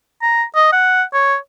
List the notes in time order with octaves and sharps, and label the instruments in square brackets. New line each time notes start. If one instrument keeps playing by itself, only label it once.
[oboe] A#5
D#5
F#5
C#5